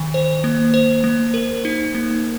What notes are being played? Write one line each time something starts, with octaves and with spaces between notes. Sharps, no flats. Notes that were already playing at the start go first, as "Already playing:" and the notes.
Already playing: D#3
C5
A#3
C5
A#3
A#4
D#4
A#3